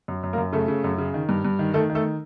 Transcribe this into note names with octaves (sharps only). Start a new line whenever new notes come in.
F#2
F#2
A#3 A#4
F#2
C#3 A3 A4
C#3
F#2
C#3
D#3
G2
G2
D#3
D#3 A3 A4
D#3
A3 A4